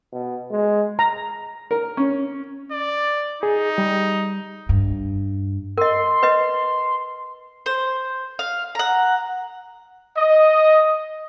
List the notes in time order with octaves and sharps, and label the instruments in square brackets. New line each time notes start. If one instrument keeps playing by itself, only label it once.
[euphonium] B2
G#3
[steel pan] A#5
[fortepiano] A#4
C#4
[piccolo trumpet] D5
[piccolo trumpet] D#4 [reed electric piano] G#4
[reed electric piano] G3
[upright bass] G2
[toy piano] A#4 D#5 [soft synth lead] C6
[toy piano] B4 D#5
[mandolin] C5
F5
F#5 A#5
[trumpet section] D#5